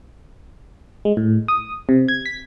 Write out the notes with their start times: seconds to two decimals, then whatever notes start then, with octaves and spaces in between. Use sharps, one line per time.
1.05 G#3
1.17 A2
1.48 D#6
1.89 C3
2.08 G#6
2.26 B6